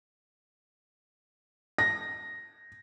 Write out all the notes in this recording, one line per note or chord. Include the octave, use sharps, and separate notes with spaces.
A#6